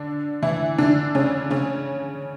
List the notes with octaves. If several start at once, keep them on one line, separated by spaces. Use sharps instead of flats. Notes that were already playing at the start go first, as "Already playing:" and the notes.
Already playing: D3 D4
E3 E4
D3 D4
C#3 C#4
C#3 C#4